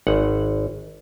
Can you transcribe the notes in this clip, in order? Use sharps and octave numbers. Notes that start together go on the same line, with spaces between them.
G#1 F#5